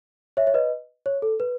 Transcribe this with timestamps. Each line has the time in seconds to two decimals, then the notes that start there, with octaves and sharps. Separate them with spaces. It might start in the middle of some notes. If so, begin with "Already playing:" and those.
0.37 C#5 E5
0.47 C#5
0.54 B4 D#5
1.06 C#5
1.22 A4
1.40 B4